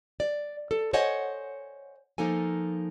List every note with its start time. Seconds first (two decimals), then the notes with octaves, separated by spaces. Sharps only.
0.20 D5
0.71 A4
0.93 C5 C#5 D#5 F#5 G#5
2.18 F3 A#3 D#4 A4 G#5